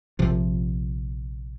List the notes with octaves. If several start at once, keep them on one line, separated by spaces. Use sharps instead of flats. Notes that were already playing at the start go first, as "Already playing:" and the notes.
A#1 C3 F3